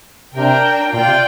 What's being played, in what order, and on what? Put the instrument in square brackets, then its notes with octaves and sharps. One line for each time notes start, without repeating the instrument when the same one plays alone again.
[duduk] C3 [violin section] D4 A#4 G5
[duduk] A#2 [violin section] F4 D5 G5
[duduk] C3